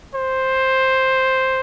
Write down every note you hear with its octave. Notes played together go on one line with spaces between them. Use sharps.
C5